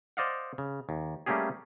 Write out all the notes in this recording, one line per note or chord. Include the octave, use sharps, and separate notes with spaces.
C5 D5 D#5 F5 F#5
C#3
D#2
G3 A3 A#3 C#4 G4 G#4